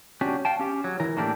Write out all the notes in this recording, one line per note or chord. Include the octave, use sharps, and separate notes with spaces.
C#4 D4 F#4 G4
F5 G5 A5
C#4 G4
F#3
E3 A#4
A2 A#3 D4 D#4 G4 A4